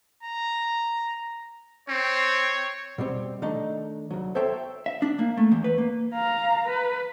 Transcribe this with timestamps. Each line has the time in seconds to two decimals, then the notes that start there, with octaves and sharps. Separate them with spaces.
0.23 A#5
1.89 C4 C#5
2.98 B2 G3 C4
3.42 D#3 A3 D4 D#4
4.11 D2 F#3
4.35 A4 C5 C#5 E5 G5
4.86 E5
5.02 D4
5.19 A#3
5.37 A3
5.52 E2
5.64 B4
5.78 A#3
6.14 F5 A#5
6.65 B4